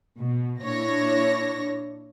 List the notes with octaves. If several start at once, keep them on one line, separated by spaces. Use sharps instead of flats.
B2
A#2 D4 E4 C#5 A#6